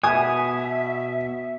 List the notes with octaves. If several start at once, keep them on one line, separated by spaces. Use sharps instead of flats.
B2 E5 G#5 D#6